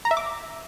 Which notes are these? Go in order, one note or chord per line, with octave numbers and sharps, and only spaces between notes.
A#5
E5
D6